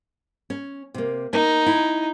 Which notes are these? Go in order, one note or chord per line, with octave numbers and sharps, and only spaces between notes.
C#4
C3 A#3
A#3 D#4
E4